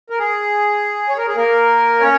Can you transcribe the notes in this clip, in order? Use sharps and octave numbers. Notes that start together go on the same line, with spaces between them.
A#4
G#4
C#5
A#4
G#4
A#3 A#4
C#4 C#5